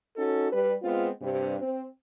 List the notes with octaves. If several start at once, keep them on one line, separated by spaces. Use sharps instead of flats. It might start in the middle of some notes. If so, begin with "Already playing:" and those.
C#4 D#4 F#4 A4
G3 B4
G#3 B3 C4 F4
G2 C3
C4